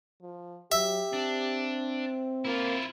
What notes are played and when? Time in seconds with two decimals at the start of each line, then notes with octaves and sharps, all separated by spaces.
0.22 F3
0.72 F#3 G4 E5
1.13 C4 D4
2.45 A#3 E4 F4